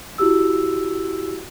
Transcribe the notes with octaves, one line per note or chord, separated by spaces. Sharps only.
E4 F#4 G4 E6